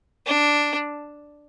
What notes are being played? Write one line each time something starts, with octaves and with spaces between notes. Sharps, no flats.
D4